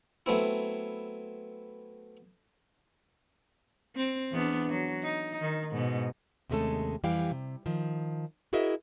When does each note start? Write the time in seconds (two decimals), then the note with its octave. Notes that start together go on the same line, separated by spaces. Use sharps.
0.26 F#3 A3 B3 C4 E4
3.96 C4
4.32 E2 B3 D4
4.69 F#3
5.03 D#4
5.41 D#3
5.71 G#2 B2
6.50 D#2 C3 G#3 A3 C#4 A4
7.03 F2 E3 G3 G4 F5 G5
7.31 C3
7.66 D#3 F3
8.53 E4 F#4 G#4 A#4 D#5 E5